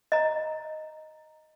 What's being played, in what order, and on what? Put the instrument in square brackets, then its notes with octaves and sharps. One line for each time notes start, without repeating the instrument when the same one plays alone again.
[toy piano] D#5 A#5